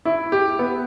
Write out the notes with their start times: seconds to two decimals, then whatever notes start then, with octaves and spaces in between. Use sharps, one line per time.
0.05 E4
0.32 G4
0.59 B3